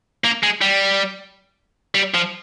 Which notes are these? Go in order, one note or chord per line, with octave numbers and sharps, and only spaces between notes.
A#3
G#3
G3
G3
F3